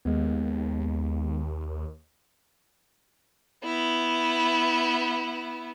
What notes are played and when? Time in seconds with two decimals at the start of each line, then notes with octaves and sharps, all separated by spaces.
0.05 D#2 G#3 B3
3.64 B3 E4